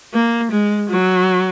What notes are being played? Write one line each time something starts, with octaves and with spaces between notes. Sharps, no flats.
A#3
G#3
F#3